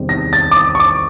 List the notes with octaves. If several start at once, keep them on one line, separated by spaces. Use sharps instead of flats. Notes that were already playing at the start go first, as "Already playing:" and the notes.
Already playing: E2 C3 D#3 G3 C4
A#6
A6
D6
D#6
C#6
D6